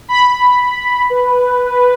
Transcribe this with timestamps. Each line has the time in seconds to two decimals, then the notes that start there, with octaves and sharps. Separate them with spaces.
0.09 B5
1.10 B4